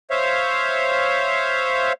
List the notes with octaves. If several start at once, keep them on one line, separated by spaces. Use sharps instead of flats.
C5 C#5 E5 F5